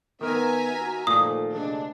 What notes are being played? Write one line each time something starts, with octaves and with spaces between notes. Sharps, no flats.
D#3 B3 A#4 E5 G#5 A#5
F#4
A#2 D#3 F3 A3 A4 D#6
D2 C3 G#3 D4